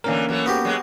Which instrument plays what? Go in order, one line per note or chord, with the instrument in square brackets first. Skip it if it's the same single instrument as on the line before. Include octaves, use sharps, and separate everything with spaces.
[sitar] A2 D3 E3 [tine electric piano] A#3 C#4 A#4
[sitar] E3 F#3 A3
[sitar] G#2 [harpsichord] B3 F#4 G4
[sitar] F#3 G#3